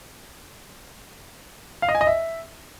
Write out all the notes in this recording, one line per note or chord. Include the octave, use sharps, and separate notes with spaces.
F5
D#5
G#5
D#5
E5